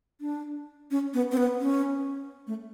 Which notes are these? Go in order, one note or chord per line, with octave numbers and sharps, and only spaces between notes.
D4
C#4
B3
C4
B3
C#4
A3